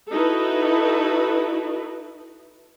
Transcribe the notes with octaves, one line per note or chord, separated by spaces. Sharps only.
D#4 E4 F#4 A4 B4